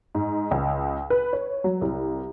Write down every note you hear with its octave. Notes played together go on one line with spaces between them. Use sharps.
G#2
C#2
B4
C#5
F#3
C2